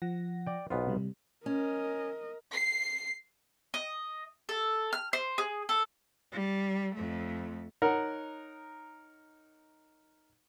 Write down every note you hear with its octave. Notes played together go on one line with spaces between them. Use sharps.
F3 F#5 A#6
D5 G5
B1 B3 F4 C5
C3 G3
C#4 A#4 D#5
C7
D#5
A4
F6
C5
G#4
A4
G3
F2 A3
D#4 A#4 C#5 F#5